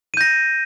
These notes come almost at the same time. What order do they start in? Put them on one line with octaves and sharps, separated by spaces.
D#7 G6 A#6